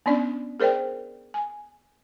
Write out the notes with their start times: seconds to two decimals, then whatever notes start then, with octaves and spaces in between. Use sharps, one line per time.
0.06 B3 C#4 D4 D5
0.60 G#4 A#4 C5 D5 G5
1.34 G#5